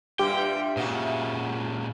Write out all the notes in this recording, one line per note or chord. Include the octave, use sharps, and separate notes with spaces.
G2 A#2 G3 G4 E5 G5
A#2 C#3 F#4 D#5